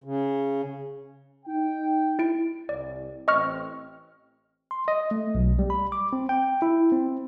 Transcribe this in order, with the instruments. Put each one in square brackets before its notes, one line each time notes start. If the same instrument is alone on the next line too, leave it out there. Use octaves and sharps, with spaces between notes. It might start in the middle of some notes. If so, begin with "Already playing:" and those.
[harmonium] C#3
[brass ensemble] D#4 G5
[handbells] E4 D7
[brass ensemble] C2 [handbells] D5
[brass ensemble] A1 C4 [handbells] D#5 C#6 F6
[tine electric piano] C6
D#5
A3
B1
G3
B5
D6
C4
G5
E4
C4